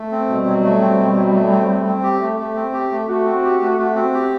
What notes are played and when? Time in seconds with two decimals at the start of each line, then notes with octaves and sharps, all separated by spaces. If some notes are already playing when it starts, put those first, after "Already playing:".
Already playing: A3
0.11 C4
0.28 B2 G3
0.46 F#3
0.64 A3
0.81 C4
0.99 B2
1.16 F#3
1.34 A3
1.51 C4
1.68 A3
1.86 C4
2.03 G4
2.21 A3
2.39 A3
2.56 C4
2.73 G4
2.91 A3
3.08 A3 F#4
3.26 C4
3.44 G4
3.61 A3
3.78 A3
3.96 C4
4.14 G4